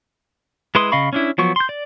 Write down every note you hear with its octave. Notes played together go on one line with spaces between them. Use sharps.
G#3 E4 B4 C6 D#6
C#3 D#5 F5 B5 C#6
C#4 D4 E4
F3 F#3 B3 C#6
C6 G6
D5